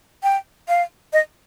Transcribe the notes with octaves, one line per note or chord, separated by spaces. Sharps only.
G5
F5
D#5